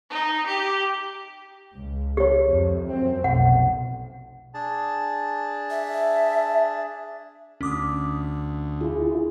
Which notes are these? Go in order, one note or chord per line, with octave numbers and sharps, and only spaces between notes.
D#4
G4
C#2
G4 C#5
F2
F#2 C4
F1 B1 F#5
D4 G#4 A5
E5
D2 C#4 D6 D#6
E4 F4 G#4